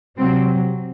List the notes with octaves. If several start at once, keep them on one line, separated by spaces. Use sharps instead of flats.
C3 F#3 C4